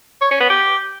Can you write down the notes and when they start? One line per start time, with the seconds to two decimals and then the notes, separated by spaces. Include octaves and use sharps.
0.22 C#5
0.31 C#4
0.40 B3
0.50 G4